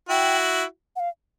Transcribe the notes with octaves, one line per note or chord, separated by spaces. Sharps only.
E4 F#4 G5
F#5
F5